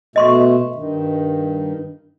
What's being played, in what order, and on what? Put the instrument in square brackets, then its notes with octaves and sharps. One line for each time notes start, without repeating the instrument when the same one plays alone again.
[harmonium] B2 A3 [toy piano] D#5 C6 C#6
[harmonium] G2 D#3